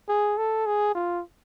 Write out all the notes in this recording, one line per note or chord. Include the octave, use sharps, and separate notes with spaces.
G#4
A4
G#4
F4